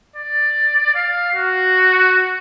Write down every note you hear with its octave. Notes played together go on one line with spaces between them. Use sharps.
D5
F5
F#4